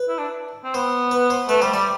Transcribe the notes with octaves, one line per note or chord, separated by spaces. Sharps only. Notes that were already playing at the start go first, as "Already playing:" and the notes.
Already playing: B4
E4
D4
C4
B3 C5
B4
C5
A3 B4
G3 C5
G3 D5